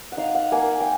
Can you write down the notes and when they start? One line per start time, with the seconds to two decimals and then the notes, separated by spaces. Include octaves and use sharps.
0.12 F#5
0.17 D#4 F5
0.35 F#5
0.52 A#3 G#5
0.80 G5